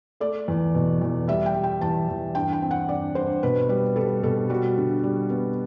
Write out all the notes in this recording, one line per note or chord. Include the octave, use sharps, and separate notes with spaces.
A3 D5
E2
B2
E2
G3 E5
G5
G3
G5
E2 A5
E2
G2 G5
G5
C4
F#5
G2 D5
G2 C5
B2 B4
G3 B4
G3 A4
B2 A4
G3 F#4
D3
G3
B3